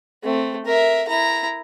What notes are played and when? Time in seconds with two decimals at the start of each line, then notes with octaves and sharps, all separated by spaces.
0.23 A3 C4
0.66 A#4 E5
1.08 E4 A#5